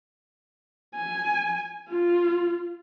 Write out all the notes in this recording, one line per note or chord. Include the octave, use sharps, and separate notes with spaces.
G#5
F4